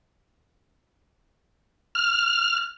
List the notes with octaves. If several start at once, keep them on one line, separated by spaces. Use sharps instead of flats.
F6